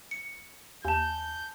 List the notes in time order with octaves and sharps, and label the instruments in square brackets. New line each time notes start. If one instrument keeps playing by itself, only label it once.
[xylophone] C#7
[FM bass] D#2 [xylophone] G#5 A5 [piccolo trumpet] G6